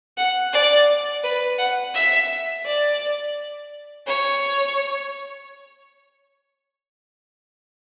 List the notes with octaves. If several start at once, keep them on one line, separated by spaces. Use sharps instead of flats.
F#5
D5
B4
F#5
E5
D5
C#5